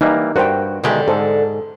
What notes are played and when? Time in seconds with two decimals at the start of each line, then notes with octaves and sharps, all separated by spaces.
0.01 E3 G3 A#3 D#4 D5
0.36 G2 F#4 A#4 C5 G5
0.84 B2 D3 D#3 G#3 G4 E5
1.08 G#2 A4 C5